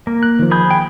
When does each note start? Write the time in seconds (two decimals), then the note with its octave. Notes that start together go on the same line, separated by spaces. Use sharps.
0.07 A#3
0.23 F#6
0.39 D#3 F3
0.51 G#4 B5 G6
0.70 G5